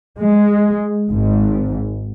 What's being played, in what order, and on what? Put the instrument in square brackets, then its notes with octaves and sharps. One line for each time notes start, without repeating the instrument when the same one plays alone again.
[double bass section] G#3
G#1 G#2